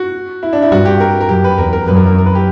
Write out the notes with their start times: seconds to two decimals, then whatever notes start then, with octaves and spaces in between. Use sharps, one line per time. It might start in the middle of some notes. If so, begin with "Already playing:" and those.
Already playing: F#4
0.43 E4
0.53 D4
0.62 E4
0.71 G2 F#4
0.85 G4
1.00 A#4
1.21 A#4
1.29 F#2 G4
1.44 B4
1.58 E2 A#4
1.73 A#4
1.87 F#2 B4
1.96 A#4
2.06 A#4
2.18 A#4
2.26 B4
2.35 G4